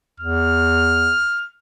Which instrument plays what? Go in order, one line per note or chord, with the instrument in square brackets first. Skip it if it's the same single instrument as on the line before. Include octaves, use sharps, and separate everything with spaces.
[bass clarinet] E2 [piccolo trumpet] F6